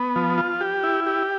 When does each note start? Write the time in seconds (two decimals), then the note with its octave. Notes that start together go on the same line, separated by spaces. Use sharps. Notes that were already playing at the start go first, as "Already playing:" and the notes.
Already playing: B3
0.16 F3
0.38 F4
0.61 G4
0.83 E4
1.06 G4